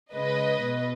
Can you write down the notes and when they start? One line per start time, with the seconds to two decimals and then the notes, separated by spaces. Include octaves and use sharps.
0.14 C#3 G#3 B4 D#5
0.65 B2